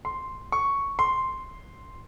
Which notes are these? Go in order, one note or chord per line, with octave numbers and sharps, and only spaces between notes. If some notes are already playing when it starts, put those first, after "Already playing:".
C6
C#6
C6